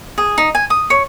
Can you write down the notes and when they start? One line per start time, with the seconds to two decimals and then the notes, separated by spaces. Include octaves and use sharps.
0.18 G#4
0.38 D#4
0.55 G#5
0.70 D#6
0.90 C#5